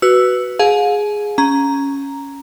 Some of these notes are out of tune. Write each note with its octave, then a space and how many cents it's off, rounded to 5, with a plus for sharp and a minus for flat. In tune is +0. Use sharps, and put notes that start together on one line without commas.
F#4 +5 B4 +0 E6 +0
G#4 +0 F5 +40 G#5 +45
C#4 +0 A#5 +0